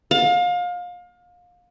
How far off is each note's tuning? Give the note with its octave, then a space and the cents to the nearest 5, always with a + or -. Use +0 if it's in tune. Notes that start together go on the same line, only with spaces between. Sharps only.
F5 +30